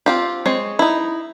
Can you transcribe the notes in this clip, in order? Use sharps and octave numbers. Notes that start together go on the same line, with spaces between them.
C4 F4 G4
G#3 C4 C#5
D#4 E4